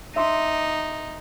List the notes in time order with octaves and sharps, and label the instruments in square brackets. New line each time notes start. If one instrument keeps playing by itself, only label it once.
[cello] D#4 [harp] E5 C6 D6